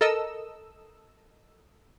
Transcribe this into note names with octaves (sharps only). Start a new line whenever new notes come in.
A4 A#4 D#5 E6